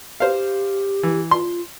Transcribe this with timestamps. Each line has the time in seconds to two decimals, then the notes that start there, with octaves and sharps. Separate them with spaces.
0.20 G4 C5 F5
1.03 E3
1.31 F4 C6